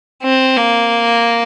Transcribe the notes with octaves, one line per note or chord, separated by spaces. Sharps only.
C4
A#3